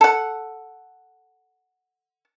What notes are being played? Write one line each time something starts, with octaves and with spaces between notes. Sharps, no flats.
A4 F#5